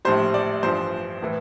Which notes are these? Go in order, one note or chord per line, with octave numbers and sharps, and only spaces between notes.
A#1 A2 G3 C5
D5
A1 G2 F3 C5
A2 E3